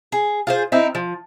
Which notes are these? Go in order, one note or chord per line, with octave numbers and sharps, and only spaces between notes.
G#4
F4 G#4 C5
C4 D#4 E4
F3